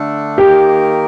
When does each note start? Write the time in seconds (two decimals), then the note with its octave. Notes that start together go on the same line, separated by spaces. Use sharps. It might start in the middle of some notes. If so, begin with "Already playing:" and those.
Already playing: D3 A3 D4 A4
0.37 D#3 A#3 D#4 G4 A#4